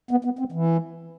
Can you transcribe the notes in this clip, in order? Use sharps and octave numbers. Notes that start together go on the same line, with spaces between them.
B3
B3
C4
E3